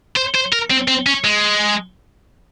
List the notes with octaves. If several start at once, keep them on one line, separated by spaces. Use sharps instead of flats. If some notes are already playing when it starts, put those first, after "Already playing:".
C5
C5
A#4
C4
C4
C#4
G#3